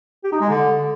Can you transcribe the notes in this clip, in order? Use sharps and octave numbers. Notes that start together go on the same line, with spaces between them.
G4
D#4
G#3
D3